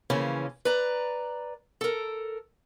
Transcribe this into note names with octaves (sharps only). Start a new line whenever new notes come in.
C#3 E3 F3 A#3 C#4
B4 D5 A#5
A4 A#4